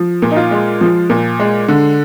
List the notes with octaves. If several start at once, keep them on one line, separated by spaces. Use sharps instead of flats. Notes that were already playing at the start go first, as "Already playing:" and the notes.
Already playing: F3
A#2
D#4
F4
G#3
F3
A#2
G#3
D3